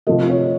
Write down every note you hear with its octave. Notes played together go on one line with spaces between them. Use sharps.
C3 F3 A3 D#5
C#5